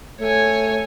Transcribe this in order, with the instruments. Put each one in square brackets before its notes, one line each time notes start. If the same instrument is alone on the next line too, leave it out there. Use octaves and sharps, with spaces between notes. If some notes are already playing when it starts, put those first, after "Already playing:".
[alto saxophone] A3 [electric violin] C#5 G#5